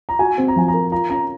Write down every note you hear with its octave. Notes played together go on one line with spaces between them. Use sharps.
A#5
F#4 G#5
C4
A#5
F3 G#5
A#4 A#5
F4 A#5
C#4 A#5